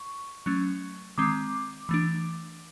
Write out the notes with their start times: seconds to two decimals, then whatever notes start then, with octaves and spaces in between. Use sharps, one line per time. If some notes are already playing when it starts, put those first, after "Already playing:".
Already playing: C#6
0.46 F#3 A3 C#4
1.18 D#3 G#3 C4 D6
1.89 E3 A3 D4